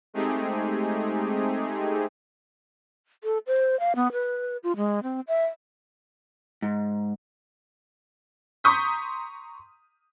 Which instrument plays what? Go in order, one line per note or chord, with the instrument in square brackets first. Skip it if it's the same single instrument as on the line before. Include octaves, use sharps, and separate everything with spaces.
[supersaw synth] G#3 A3 C4 D#4 G4 G#4
[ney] A4
C5
F5
B3
B4
F4
G#3
C4
E5
[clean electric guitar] G#2
[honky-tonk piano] A#5 C6 C#6 D#6 G6 B6